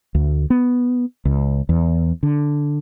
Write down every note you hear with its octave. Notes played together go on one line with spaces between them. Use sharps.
D2
B3
C#2
E2
D3